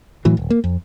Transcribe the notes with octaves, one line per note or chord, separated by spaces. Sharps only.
A2 E3 F#3
D#1
A#3
F2